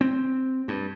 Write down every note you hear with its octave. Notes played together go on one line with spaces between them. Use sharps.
C4
G2